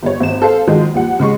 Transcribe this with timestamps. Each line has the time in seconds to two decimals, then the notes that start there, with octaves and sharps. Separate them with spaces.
0.03 G1 G3 C#5
0.20 G#1 E7
0.42 A4 C5 F5
0.67 D#3 F3 F#3 G#3
0.94 D#2 F3 G3 F#5
1.19 C#3 G#3 C#6